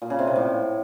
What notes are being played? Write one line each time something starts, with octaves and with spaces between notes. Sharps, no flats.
A#2
C#3
C3
A#2
A2